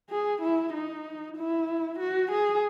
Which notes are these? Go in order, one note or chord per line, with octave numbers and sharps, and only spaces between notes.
G#4
E4
D#4
E4
F#4
G#4